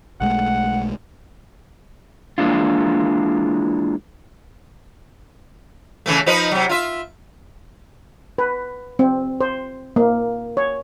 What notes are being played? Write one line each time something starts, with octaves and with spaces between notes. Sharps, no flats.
B1 G#3 A3 F#5
E3 G#3 A#3 D4 E4 F4
C#3 E3 A3
F3 D#4 B4
C3 F#3
F4 E5
B4
C4
C5
A#3
C#5